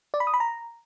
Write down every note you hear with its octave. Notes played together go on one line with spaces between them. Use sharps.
D5
B5
D#6
B5
A#5